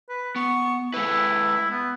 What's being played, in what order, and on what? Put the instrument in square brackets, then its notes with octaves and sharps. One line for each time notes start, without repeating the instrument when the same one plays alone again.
[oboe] B4
[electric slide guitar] B3 [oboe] C#6
[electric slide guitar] G#3 A4 B4 [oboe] E4
[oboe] B3